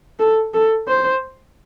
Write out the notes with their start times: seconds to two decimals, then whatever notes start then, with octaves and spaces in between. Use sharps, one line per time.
0.19 A4
0.54 A4
0.88 C5